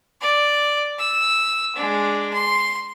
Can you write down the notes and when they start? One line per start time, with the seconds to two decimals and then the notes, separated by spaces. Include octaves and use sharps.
0.21 D5
0.98 E6
1.76 G#3 D4
2.33 C6